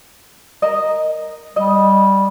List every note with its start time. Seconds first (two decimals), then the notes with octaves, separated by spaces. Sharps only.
0.62 A#4 D#5
1.56 G3 D#5